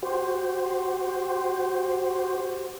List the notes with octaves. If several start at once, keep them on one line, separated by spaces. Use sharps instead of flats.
F#4 G4 C5